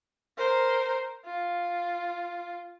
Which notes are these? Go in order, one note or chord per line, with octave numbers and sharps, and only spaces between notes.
A#4 C5
F4